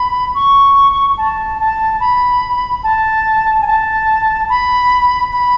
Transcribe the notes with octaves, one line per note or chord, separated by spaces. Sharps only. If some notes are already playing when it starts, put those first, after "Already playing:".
Already playing: B5
C#6
A5
A5
B5
A5
G#5
A5
B5
B5